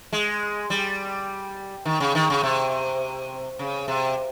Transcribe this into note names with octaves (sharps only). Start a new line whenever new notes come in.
G#3
G3
D#3
C#3
D#3
C#3
C3
C#3
C3